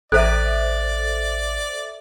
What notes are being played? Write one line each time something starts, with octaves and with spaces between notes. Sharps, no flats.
A1 A4 C5 D5 E5 F#6